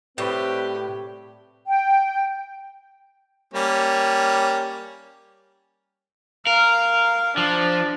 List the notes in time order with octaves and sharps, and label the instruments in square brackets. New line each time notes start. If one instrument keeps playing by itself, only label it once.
[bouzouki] A2 [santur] G3 C#5 B5 [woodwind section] C4 B4 [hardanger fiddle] G4
[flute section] G5
[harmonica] G3 A#3 C#4
[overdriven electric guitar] A#4 [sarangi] F5
[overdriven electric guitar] F3 [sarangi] D4